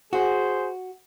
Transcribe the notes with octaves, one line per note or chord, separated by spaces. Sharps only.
F#4 G#4 C5